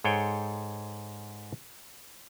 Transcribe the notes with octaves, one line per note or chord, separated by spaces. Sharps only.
G#2 G#4 A4 C#5 G5